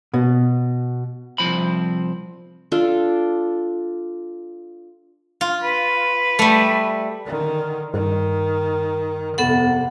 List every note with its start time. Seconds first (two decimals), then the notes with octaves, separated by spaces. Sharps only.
0.14 B2
1.38 C2 F2 F3 C4 B5
2.72 D4 F4 A4 D5
5.41 F4
5.63 B4
6.39 G3 A3
7.26 D3 D#3
7.94 G2 D#3
9.38 F2 C3 B3 A4 F#5